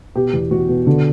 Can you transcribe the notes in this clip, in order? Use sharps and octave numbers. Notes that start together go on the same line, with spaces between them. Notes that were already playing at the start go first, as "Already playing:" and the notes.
B2 G4
E2
E2 F#4
B2
D3